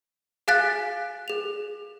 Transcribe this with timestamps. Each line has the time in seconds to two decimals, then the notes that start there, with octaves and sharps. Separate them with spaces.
0.48 G#4 F5 G#5 F#6 A6 B6
1.28 G#4 F7